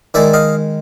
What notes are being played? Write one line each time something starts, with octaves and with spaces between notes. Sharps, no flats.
D#3 G#3 D5 E5
D#5 F5